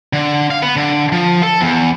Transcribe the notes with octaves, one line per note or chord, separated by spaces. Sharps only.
D3
F5
B3
D3
F3
A4
E2